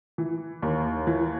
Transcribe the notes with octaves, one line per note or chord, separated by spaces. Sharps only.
E3
D#2
E3